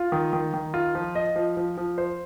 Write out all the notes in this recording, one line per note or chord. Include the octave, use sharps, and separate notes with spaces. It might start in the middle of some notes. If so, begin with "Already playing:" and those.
Already playing: F4
D#3
D#3
D#3
F4
F3
D#5
F3
F3
F3
C5